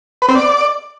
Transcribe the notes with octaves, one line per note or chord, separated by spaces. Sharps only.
B4
C4
D5